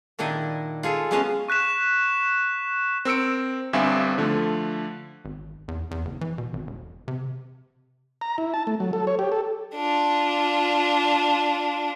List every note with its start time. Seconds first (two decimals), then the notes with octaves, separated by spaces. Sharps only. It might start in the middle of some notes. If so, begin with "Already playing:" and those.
0.19 A#2 D#3 D4 E4 D#5
0.83 F4 G#4 A4
1.11 G#3 B3 C#4 D#5 F5 A5
1.48 C#6 F#6 B6 E7
3.05 C4 A#4 E6 C#7 D7
3.73 G1 G2 C4 E5 F5 G#5
4.18 D3 F3 A3
5.25 G#1
5.68 E2
5.91 E2
6.05 F#1
6.21 E3
6.38 B2
6.53 G#1
6.67 E1
7.08 C3
8.21 A#5
8.38 E4
8.54 A5
8.67 A3
8.80 F#3
8.93 A4
9.07 C#5
9.19 G4
9.32 A4
9.75 D4 F4